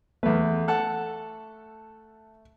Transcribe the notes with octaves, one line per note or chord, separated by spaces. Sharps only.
E2 A3 B4
A4 F#5 A5